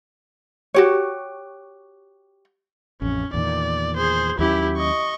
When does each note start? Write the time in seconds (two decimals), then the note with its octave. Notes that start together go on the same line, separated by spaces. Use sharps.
0.74 F#4 G4 C#5
3.02 A1 F2 C#4
3.34 E2 A#2 D#3 D5
3.97 G#4 C5
4.39 D#2 F#3 C#4 E4 G4
4.78 D#5 C#6